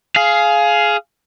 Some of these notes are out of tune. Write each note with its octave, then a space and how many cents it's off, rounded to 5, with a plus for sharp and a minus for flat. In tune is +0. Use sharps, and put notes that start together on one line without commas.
G#4 +15 F5 -5